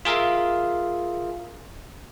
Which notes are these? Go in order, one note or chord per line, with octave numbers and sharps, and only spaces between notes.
F4 G#4 A#4 E5 F5